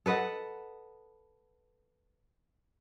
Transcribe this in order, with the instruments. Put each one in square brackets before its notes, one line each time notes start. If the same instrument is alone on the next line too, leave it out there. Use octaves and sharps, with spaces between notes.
[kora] A4 B4 D#5 F#5